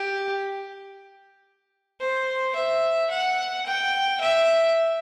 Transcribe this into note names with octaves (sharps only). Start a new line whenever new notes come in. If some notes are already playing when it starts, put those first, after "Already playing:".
Already playing: G4
C5
E5
F#5
G5
E5